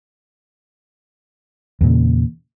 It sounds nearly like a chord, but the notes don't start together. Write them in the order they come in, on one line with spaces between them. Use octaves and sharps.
E2 A#2 C#3